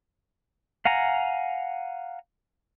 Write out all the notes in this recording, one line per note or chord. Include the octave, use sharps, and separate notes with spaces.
F5 F#5 G#5 A#5